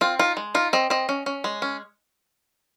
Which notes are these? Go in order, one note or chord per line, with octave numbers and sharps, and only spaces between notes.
C4 F4
D#4 F4
G#3
D#4 F4
C4 D#5
C4 D#5
C#4
C#4
G#3
C#4